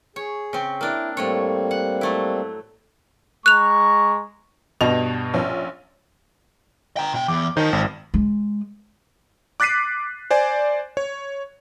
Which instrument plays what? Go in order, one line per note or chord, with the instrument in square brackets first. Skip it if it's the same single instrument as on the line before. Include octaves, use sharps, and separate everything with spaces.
[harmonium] G#4 [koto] C#5
[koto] C#3 C4
[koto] A#3 D4 [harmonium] E4
[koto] A2 A3 C#5 [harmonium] G3 A#3 C4
[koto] F#5
F#3 A3 E4
[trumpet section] G#3 A#5 C#6 [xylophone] F#6 F7
[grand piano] G2 B2 F7 [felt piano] D#5
[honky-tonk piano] A#1 C#4
[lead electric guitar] G5 A#5
B2 G5
[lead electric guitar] E2 [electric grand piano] D6
[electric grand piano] D#3 D#4 [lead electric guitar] C5 A5
[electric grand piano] G#1
[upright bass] G#3
[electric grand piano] D6 F#6 A6 B6 C7 D#7
C5 D5 G#5
C#5